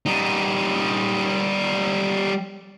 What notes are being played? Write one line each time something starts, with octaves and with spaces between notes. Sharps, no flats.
G3 D#4